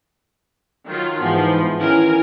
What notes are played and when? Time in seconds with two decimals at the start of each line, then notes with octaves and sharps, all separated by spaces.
0.87 D#3 F#3 F4
1.20 G#2 E3 F3 B3
1.80 D#3 E3 C#4 E4 A#4 G#5